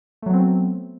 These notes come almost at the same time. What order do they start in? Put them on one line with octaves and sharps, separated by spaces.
A3 F#3 B3 C4